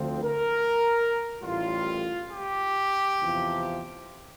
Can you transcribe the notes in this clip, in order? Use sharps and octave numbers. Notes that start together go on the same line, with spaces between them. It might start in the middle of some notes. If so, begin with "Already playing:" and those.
Already playing: D2 D3 F3 C4
A#4
A1 A2 G3 F4
G4
E2 C3 F3